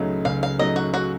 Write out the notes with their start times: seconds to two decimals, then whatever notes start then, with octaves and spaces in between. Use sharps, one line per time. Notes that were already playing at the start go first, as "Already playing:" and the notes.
Already playing: C#2 C#3 F#3 A3 D#4
0.25 C#2 F5
0.43 F5
0.59 C#3 F#3 A3 D#4 D#5
0.76 F#4
0.94 F#4